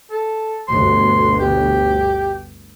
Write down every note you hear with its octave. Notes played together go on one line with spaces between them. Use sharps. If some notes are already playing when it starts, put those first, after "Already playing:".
A4
G1 D2 B2 C6
G4